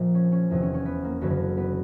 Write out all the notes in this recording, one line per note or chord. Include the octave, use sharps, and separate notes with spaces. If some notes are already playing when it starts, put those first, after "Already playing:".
Already playing: A#1 A#2 F3
C#4
C#4
F1 E2 C3 D#3
C#4
C#4
B3
A#3
F#1 F#2 D3 F#3 B3
B3